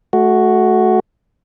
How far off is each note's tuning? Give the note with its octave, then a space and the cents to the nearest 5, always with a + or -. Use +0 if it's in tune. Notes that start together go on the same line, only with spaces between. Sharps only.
A3 -25 F#4 +0